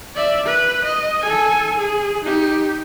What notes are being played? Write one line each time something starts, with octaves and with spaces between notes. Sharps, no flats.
D5 E5
B4
D#5
A4 G#5
G#4
D#4 G4